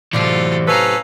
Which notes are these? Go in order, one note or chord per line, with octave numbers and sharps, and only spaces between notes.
A2 C3 E3 F#3 F4 A4 D5
C#4 A4 B4 F5 A#5